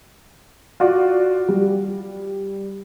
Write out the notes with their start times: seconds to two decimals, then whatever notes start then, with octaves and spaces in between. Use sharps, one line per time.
0.80 F4 F#4 D5
1.49 G3